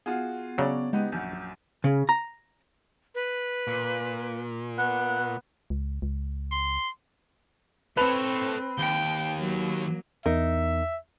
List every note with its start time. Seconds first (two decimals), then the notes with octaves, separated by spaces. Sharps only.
0.06 B3 F4 F#4 G#4
0.58 C#3 F#3 D4 C#5 D5
0.93 G#3 B3 D#4 G4
1.12 A#1 F#2 F#5 G6
1.84 C#3
2.09 A#5
3.15 B4
3.67 A#2
4.78 B3 F#6
5.70 C#2
6.02 C#2
6.52 C6
7.97 C4 A4 B4 C#5 F7
8.78 D#2 G5
9.36 F#3 A#3
10.26 E2 D#4 A#4 E5